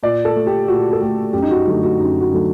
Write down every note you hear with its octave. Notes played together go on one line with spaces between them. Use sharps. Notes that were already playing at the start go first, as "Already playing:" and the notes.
A#2 D5
A4
A3
G4
A#2 F#4
A4
A3 G4
F#2 G4
D#4
F#4
D3 F#3 A3 F#4
F#4
F#2 D#4
F#4
D3 F#3 A3